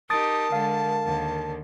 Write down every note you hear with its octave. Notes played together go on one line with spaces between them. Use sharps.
D#4 G4 A#4 A5 D#6 A6 D7
D3 G#3 F5
D#2 D3